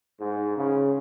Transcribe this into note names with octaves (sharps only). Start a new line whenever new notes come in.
G#2
C#3